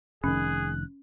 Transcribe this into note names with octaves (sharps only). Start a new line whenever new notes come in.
F1 D#3 C#4 G#4 F#6